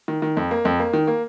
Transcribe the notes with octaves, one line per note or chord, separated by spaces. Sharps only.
D#3
D#3
F2
A#3
F2
A#3
D#3
A#3